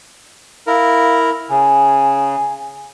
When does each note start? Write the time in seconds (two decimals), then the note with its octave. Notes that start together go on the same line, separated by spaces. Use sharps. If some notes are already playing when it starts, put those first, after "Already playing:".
0.67 E4 A#4 F5
1.50 C#3 G#5